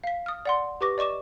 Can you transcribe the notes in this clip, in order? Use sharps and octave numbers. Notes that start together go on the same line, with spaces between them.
F5 B6
D#6 F6
D5 F#5 C6
G4 B4 C#6 D6 A#6
D5 D#5 C#6 D6 E7